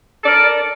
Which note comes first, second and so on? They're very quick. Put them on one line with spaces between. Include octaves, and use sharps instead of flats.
A4 D5 A#4